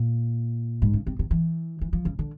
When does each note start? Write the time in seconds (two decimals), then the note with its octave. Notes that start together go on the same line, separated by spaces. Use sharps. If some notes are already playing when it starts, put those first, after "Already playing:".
Already playing: A#2
0.82 G#2
0.93 C#3
1.07 C3
1.19 C3
1.31 E3
1.81 E3
1.93 F3
2.05 C#3
2.19 D3